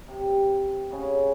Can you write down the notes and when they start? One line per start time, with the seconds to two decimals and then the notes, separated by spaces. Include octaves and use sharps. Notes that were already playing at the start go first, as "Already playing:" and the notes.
0.08 C3
0.90 G#2 C#3